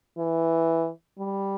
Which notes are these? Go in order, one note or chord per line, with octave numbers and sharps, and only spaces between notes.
E3
G3